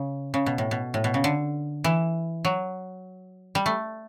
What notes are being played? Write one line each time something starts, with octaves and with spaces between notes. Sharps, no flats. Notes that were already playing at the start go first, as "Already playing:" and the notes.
Already playing: C#3
C#3
B2
A2
B2
A2
B2
C#3
D3
E3
F#3
G3
A3